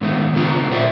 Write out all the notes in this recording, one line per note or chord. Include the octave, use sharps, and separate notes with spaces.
G#2 D3 D#3 A3 B3
A2 C#3 D4 F4 B4 A#5
A#2 C5 D5 E5